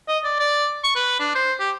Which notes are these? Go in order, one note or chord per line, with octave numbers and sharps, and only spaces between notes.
D#5
D5
D5
C#6
B4
D4
C5
G4